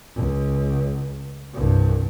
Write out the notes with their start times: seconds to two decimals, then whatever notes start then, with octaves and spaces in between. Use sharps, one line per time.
0.15 C#2
1.53 C2 G2